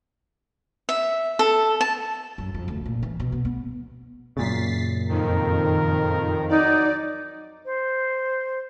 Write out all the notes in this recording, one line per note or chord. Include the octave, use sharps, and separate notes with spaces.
E5
A4
A5
F#2
F2
D2
A#2
E3
B2
B3
B3
F#2 A#2 C#3 A6 B6 C7
F2 D#3 A#4
F#3 D#4 D5
C5